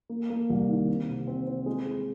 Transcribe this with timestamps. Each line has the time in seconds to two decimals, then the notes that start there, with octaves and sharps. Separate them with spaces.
0.10 A#3
0.30 A#3
0.50 C2
0.68 D#3
0.88 C4
1.09 C3
1.27 C4
1.47 C4
1.66 G#3
1.86 G#3